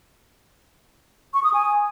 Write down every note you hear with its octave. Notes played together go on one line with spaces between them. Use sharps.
C#6
D#6
G#5